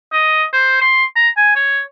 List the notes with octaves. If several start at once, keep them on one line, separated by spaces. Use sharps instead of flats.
D#5
C5
C6
A#5
G#5
C#5